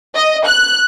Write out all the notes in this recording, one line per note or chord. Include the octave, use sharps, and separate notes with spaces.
D#5
F#6